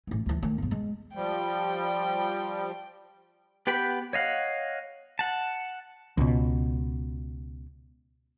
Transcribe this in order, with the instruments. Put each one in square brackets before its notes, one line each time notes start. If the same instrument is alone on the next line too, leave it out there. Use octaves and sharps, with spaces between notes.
[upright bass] A1 E3
D2 E3
D#3 A3
B1 G2
G#3
[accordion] F3 G3 [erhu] G5
[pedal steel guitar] B3 G4 B4 G5 B5
C#5 D#5 F5 F#5
F#5 A5
[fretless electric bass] C#2 B2